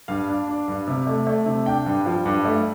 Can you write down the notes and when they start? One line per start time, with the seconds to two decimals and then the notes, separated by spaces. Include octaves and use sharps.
0.08 G2 F5
0.28 D4
0.48 D4
0.68 G2
0.87 C3
1.07 A3
1.27 A3
1.46 C3
1.66 D4 G5
1.86 G2
2.06 F3
2.25 G2
2.45 A3